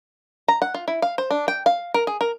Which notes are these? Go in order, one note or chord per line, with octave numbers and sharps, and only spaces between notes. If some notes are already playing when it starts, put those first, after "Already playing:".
A#5
F#5
F4
E4
F5
C5
D4
G5
F5
A#4
G#4
A#4